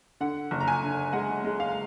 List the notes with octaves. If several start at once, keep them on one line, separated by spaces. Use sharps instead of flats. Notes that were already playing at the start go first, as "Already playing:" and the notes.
D3 F#5
F#1
A#5
G#5
D3
G#3 F#5
G#3
F5